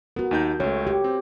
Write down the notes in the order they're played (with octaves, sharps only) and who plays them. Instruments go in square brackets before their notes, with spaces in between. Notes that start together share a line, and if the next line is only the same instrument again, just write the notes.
[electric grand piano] B3 [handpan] F#4 A#4
[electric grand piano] D#2 D#4 G6
[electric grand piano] C#2 A3 [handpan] C#5
[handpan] G4
[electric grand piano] C4